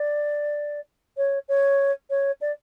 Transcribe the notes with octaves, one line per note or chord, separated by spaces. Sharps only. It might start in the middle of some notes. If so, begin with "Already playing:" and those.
Already playing: D5
C#5
C#5
C#5
D5